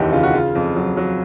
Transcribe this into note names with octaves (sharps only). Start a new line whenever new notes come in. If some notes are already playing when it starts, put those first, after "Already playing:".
Already playing: F1 D#2 C#3 E3 D#4 E4 F#4 G4
C#3 F4
F#4
C#3 F4
F2
F#3
F#3